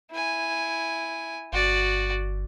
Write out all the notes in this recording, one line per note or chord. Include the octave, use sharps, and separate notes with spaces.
E4 G#5
G1 F#4 D5